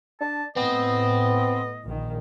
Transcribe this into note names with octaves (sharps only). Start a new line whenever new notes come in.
D4 A5
A2 B3 C4 D#5
A#1 D#3